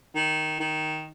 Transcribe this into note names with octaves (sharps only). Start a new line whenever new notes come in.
D#3
D#3